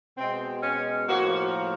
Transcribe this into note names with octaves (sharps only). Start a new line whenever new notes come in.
B2 G#3 C4
C#4
A2 F3 A#3 F#4